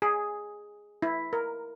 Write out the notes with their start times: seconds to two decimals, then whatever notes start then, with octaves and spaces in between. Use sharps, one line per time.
0.02 G#4
1.02 E4
1.33 A#4